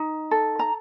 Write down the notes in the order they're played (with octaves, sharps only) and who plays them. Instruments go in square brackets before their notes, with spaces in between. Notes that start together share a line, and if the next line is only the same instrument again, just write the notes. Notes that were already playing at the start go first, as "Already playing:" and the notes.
Already playing: [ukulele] D#4
A4
A#5